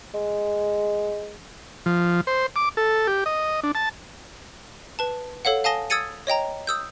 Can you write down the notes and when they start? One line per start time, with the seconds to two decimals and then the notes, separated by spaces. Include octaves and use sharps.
0.14 G#3
1.86 F3
2.27 C5
2.56 D6
2.77 A4
3.07 G4
3.26 D#5
3.63 D4
3.75 A5
4.99 B4 A5
5.45 A4 C#5 F5 F#5
5.64 F5 G#5 A5 D#6 A#6 G7
5.90 D#6 E6 G#6 A6 C#7 D#7
6.27 C#5 D#5 G5 A#5
6.67 D#6 E6 G6